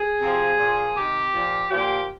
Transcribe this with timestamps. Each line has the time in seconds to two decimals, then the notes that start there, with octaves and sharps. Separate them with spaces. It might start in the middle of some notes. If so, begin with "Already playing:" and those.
Already playing: G#4
0.20 C3 F3
0.58 A#2 F3
0.95 C3 D#3 G4
1.33 A#2 F3
1.71 A#2 F3 G4